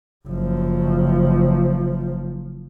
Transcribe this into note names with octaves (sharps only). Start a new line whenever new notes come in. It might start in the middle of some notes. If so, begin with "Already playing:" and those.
F#1 F3